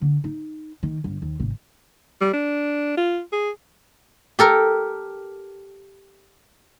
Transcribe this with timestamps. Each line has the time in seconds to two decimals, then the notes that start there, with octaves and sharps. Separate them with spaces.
0.02 D3
0.24 D#4
0.83 D#3
1.04 G1
1.22 D#2
1.40 G#1 C3
2.21 G3
2.33 D4
2.97 F4
3.33 G#4
4.39 G4 A4 A#4